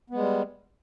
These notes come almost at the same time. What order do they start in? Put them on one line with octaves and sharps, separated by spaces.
B3 G#3 G3